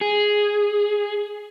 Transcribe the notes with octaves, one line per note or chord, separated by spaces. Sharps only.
G#4